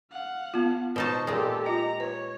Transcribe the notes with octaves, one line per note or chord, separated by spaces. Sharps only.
F5 F#5
B3 F4
B2 D#4 C5 A5 C#6
A#2 G#3 G4 A4
F4 D#5 A#5
B4 C#5